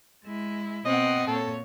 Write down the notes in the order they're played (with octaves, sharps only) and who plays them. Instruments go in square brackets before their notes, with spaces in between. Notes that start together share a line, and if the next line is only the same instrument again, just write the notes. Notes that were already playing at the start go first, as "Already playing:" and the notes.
[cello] G#3 E4
[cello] B2 F#5 [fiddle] C4 [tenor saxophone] D#5
[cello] A#2 C#5 [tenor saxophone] A4